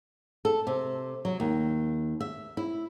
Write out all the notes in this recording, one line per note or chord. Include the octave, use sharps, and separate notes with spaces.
A4
C3
F#3
D#2
E5
E4